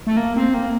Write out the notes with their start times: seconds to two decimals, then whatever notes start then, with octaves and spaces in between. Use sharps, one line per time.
0.07 A3
0.17 A#3
0.36 C4
0.54 A#3